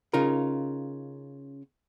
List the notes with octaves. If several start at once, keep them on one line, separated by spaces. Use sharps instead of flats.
C#3 D#4 F4 A#4